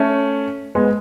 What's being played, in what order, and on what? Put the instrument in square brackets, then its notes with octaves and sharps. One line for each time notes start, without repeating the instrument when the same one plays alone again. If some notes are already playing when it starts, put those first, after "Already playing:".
Already playing: [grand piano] A3 C#4
G#3 B3